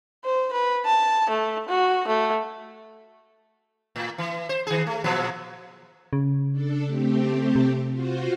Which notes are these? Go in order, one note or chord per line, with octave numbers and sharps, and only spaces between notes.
C5
B4
A5
A3
F#4
A3
A2
E3
C5
D#3 G#4
A3
A#2 F3 F#3
C#3
D4 A4
A3 C4 G4
C3
F4 F#4 C5